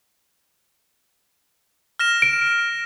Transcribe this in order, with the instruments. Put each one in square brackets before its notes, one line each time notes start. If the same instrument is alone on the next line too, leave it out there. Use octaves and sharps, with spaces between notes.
[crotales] F6 A#6 E7
[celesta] D7